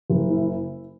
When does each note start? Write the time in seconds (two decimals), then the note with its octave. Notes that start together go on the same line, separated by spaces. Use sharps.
0.10 F#1
0.30 E4